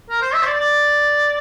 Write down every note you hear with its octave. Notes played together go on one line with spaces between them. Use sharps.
A#4
C5
E5
C5
D5
D5